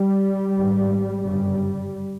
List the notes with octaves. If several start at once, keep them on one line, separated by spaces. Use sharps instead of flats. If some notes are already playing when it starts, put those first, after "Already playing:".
Already playing: G3
G#1 G#2
G1 F#2 C#3 G3